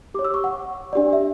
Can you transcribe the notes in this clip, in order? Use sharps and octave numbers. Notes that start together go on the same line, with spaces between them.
G4 C#5 D6
E6
C#6
F#5
D4 G4 D5
E5